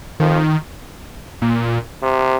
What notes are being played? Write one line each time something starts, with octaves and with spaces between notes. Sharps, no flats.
F2 D#3
A#2
C3